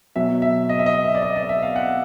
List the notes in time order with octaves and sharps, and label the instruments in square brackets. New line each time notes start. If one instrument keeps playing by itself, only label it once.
[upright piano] B2 F#3 E5
E5
D#5
E5
D#5
E5
D5
D#5
D5
E5
F5
F#5